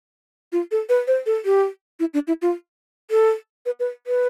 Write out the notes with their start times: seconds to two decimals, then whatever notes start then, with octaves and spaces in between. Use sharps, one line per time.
0.52 F4
0.71 A4
0.89 B4
1.07 C5
1.26 A4
1.45 G4
2.00 E4
2.14 D4
2.27 E4
2.42 F4
3.11 A4
3.66 B4
3.80 B4
4.07 B4